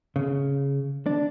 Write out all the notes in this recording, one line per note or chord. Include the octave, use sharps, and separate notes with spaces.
C#3
D4